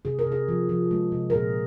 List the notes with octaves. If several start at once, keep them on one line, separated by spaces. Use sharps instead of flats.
C3 G#4
A#4
C3
G#4
F3
F3
G#3
C3
A#4
A#2 G#4